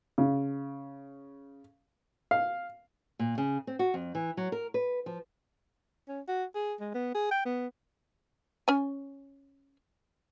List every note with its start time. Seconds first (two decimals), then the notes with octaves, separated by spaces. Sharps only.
0.18 C#3
2.31 F5
3.19 A#2
3.38 C#3
3.67 C4
3.79 F#4
3.94 F2
4.15 E3
4.37 F#3
4.52 A#4
4.74 B4
5.06 F3
6.08 C#4
6.28 F#4
6.55 G#4
6.80 G#3
6.94 B3
7.15 G#4
7.31 G5
7.45 B3
8.68 C#4 G#5